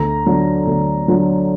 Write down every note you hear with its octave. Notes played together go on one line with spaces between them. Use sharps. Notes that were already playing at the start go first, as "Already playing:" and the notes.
Already playing: D2 A#5
D3 F#3
D2
D3 F#3